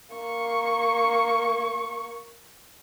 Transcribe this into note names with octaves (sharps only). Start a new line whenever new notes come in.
A#3 C#6